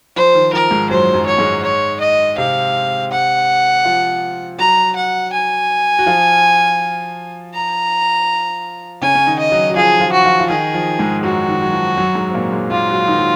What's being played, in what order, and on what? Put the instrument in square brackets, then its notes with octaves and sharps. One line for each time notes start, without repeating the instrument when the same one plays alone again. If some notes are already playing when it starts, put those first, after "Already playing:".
[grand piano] F3 [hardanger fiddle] C5
[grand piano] D#3
[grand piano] F3 [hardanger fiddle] A#4
[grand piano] G#2 G#3
[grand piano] F#2 F#3 [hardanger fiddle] C5
[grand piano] F#2 F#3
[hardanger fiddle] C#5
[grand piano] G#2 G#3
[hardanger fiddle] C#5
D#5
[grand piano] C3 C4 [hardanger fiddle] F5
[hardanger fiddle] F#5
[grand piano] F3 F4
[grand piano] F#3 F#4 [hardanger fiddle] A#5
[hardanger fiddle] F#5
G#5
[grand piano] F#4
F3 F4
[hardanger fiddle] A#5
[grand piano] C#3 C#4 [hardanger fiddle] G#5
[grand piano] C#4
D#3 D#4
[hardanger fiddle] D#5
[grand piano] F#3 F#4
F#4
[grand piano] F3 F4 [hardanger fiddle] G#4
[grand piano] F3 F4
[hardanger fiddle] F#4
[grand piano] F3 F4
F4
[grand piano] D#3 D#4 [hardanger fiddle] G#4
[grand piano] F3
G#2 G#3
[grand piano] F#2 F#3 [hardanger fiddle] F#4
[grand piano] D#3
F#3
F3
F#2 F#3
G#2 G#3
C4
A#2 A#3
G#2 G#3
[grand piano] A#2 A#3 [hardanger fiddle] F4
[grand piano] F#3 F#4
D#3 D#4
F#3